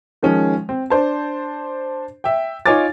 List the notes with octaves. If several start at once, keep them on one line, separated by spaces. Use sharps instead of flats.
D#3 F3 G#3 C#4
C4
D4 C5 A5
E5 G5
D#4 F4 C#5 G#5 D6 A6